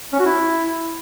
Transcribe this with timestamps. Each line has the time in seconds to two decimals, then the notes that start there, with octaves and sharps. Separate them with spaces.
0.13 C#4
0.19 F#4
0.26 E4